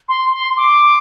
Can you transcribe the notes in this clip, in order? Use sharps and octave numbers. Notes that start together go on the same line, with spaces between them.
C6
C6
D6